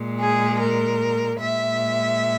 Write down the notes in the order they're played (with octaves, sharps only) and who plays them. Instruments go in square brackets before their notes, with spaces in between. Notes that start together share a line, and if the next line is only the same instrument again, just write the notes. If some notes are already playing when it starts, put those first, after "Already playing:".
Already playing: [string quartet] A#2 G#3
G#4
A#4
A#2 G#3 E5